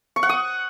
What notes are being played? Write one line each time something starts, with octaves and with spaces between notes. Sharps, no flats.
C#6
F#5
D#6